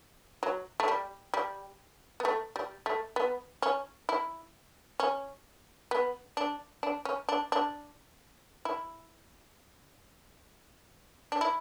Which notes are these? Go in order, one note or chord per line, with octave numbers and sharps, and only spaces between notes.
F#3
A3
G3
G3
B3
A3
G3
A3
B3
C#4
E4
C#4
B3
D4
D4
C#4
D4
D4
E4
D4
E4